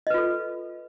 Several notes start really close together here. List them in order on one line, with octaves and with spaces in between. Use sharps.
D#5 B4 F4 A4